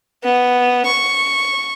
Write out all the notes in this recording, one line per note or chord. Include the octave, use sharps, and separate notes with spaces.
B3
C#6